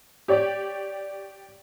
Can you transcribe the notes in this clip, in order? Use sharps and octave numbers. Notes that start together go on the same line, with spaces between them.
G4 C#5 D5